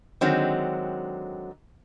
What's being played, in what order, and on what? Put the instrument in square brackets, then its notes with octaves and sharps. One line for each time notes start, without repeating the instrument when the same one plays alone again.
[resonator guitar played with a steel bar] D3 D#3 F#3 G#3 C4